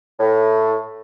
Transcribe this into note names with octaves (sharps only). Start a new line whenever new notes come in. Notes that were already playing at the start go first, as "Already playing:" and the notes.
A2